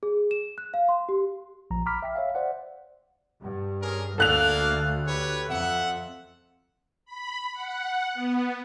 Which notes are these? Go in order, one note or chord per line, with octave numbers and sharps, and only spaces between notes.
G#4
E7
F#6
F5
C6
G4
A#1 F3 A#5
A#5 B5 D6 F6 B6
E5 G5 B6
C#5 E5 F5
C5 D5 F#5
G2
C#4 G#4 A#4
D2 A#3 D4 A4 F5 F#6 F7
G4 B4 C#5
F2 E5 F#5
B5
F#5
B3